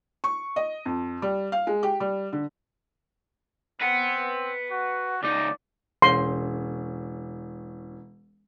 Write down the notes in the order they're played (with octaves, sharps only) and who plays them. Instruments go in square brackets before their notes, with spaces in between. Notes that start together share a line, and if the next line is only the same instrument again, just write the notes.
[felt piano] C#6
D#5
F2
G3
F5
G#3
G4
G3
D3
[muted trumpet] C4 [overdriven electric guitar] B4 F#5
[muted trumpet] F#4
[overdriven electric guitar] C#2 D#4 [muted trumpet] D5
[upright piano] E1 C#4 [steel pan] C6